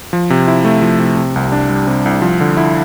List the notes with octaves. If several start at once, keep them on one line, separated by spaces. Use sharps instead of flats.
F3
C3
E4
A3
F3
C3
C3
C2
D4
G3
C3
C2
F3
D3
E4